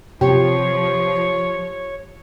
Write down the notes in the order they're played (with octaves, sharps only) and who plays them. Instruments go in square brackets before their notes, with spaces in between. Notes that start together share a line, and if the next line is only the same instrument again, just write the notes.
[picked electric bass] C3 [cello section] F3 [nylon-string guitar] G4 [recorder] C#5